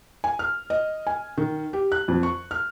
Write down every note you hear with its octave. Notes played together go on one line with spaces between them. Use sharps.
G#5
F6
D#5
G#5
D#3
G4
F#6
F2
C#6
F6